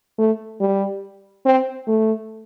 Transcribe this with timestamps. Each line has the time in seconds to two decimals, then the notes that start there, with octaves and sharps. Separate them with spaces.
0.19 A3
0.61 G3
1.46 C4
1.88 A3